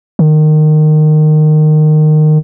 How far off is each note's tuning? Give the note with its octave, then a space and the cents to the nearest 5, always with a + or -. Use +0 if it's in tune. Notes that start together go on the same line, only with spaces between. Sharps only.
D#3 -20